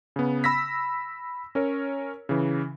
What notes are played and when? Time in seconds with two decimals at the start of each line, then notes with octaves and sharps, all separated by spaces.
0.16 C#3 B3
0.44 B5 E6 A#6 B6
1.55 C#4 A#4 C#5
2.29 C#3 E3